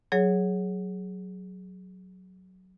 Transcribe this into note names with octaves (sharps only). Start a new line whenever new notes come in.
F#3 G#4 C#5